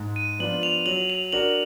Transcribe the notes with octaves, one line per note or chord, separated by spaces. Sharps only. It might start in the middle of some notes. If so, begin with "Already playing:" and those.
Already playing: G#2
D#7
F3 B3 D4 F4 F#7
F7
F#3 F#7
F7
D4 F#4 A#4 F#7